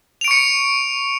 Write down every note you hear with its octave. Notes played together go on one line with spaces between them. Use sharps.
C#6 C#7 D7 F7